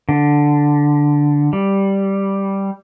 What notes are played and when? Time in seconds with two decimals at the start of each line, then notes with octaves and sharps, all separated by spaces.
0.09 D3
1.53 G3